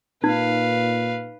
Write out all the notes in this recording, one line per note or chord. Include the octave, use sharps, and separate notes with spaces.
A#2 D#4 B4 F5